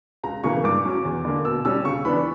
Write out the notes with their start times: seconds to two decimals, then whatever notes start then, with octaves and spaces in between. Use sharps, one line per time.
0.23 C#2 A#5
0.44 C#3 E3 A#3 C#6
0.64 G2 D6
0.85 F#3 C#4
1.05 E2
1.25 D3 A#3
1.45 B2 E6
1.65 G3 C#4 E6
1.85 C#3 C#6
2.05 E3 B3 D4 B5